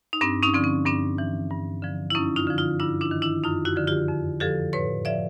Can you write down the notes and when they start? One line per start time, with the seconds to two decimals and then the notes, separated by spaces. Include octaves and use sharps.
0.13 D#4
0.21 G2 C4 D4
0.43 C#4 D#4
0.54 D3 F3 C4
0.64 C#4
0.86 G2 C4 D4
1.18 E3
1.50 G2
1.82 D3 F3
2.10 E4
2.15 F#2 C#4 D#4
2.36 D#4 F4
2.47 D3 F3
2.58 D#4 F4
2.80 G2 D4 E4
3.01 D4 E4
3.11 D#3
3.22 D4 E4
3.43 F#2 D#4 F4
3.65 E4 F#4
3.76 D3 F3
3.88 F4 G4
4.08 F2
4.40 D3 F3 G4 A4
4.73 A2 B4 C#5
5.05 F3 D5 E5